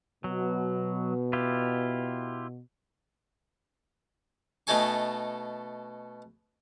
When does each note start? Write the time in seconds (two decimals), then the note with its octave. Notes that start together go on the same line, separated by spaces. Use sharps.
0.24 B2 F#3
1.33 E4 F4 G4
4.67 B2 A3 D#4 A4 G#5 C#6